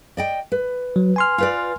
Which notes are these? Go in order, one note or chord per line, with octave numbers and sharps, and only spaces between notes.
D5 D#5 G5
B4
F#3
G#5 C6 F6
F4 B4 D5